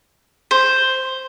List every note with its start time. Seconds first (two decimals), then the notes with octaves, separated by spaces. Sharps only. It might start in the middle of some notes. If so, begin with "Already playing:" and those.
0.51 C5